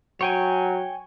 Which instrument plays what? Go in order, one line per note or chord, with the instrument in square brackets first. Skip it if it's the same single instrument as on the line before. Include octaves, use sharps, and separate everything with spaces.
[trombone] F#3 [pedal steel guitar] C#5 G5 G#5